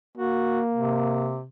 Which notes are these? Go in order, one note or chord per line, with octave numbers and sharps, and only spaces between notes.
A#3 F#4
C3